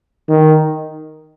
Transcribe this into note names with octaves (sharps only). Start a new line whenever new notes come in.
D#3